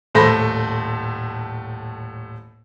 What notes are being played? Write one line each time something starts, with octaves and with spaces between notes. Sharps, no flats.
D#1 A2 A3 C5 B5 A#6